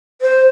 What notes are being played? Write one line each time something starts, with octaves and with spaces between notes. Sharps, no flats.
C5